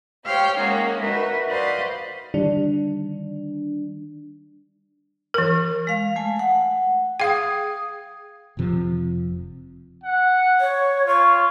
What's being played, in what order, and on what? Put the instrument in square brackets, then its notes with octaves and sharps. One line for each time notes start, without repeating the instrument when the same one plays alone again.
[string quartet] G4 C5 C#5 F5 G5
G#3 A#3 C#4 D#4 F#4
D#4 F#4 A#4 B4 E5
F#4 B4 C5 D5 D#5 F5
[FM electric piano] D3 D#3 G3 D4
[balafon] E3 A#4
[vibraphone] G#3 F5
A3 G#5
F#5
[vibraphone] G#4 D#6 [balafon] F5 G5
[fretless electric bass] F1 F2 C3 F3
[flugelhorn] F#5
[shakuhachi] C#5
[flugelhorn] F4 [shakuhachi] C#6